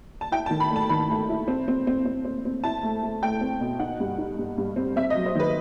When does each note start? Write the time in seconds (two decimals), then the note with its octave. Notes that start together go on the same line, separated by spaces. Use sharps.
0.21 A5
0.32 E4 G5
0.46 A5
0.51 D#3
0.60 B5
0.71 A3 A5
0.89 D#3 B5
1.10 A3
1.29 E4
1.48 C4
1.68 C4
1.87 C4
2.05 C4
2.25 C4
2.45 C4
2.64 E4 A5
2.83 A3
3.03 A3
3.22 A3 G5
3.41 C4
3.61 B2
3.80 D#4 F#5
4.00 G2
4.18 D#4
4.38 G2
4.58 G2
4.76 C4
4.96 C4 E5
5.10 D#5
5.15 F#3
5.26 C5
5.35 D#3 B4